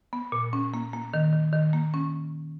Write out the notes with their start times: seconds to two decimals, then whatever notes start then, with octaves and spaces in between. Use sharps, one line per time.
0.13 B3
0.32 A#2
0.53 C#4
0.74 A#3
0.93 A#3
1.14 D#3
1.33 D#3
1.53 D#3
1.73 A#3
1.94 C#4